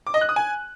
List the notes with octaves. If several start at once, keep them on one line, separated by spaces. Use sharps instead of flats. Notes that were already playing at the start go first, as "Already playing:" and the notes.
D6
D#5
F#6
D#6
G#5